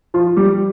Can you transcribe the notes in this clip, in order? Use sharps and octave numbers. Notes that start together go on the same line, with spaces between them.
F3 F4
G3 G4